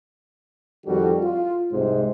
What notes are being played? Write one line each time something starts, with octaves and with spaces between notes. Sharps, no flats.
F2 D#3 G3 F#4 A4
F4
C2 G#2 C3 G#3 C5